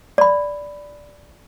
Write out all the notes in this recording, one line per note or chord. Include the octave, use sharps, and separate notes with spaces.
D5 B5